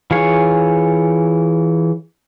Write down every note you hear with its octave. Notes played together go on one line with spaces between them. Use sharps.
E3 F4 G#4 C#5